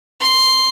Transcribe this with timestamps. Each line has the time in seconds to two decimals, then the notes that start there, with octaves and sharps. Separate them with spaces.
0.20 C6